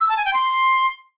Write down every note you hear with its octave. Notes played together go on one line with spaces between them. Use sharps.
E6
A5
G#5
G5
C6